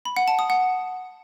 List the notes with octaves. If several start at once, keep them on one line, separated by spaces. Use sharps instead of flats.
B5
F#5
A5
D#6
F#5